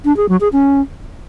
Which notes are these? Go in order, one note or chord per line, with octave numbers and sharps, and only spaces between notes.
D4
G#4
F#3
G#4
C#4